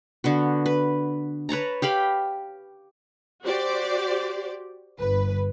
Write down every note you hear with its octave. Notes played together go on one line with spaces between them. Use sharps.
D3 B3 F#4
B4
B4 C#5 A5 A#5
G4 F5 G5 B5
F#4 G4 C5 D5
G1 B4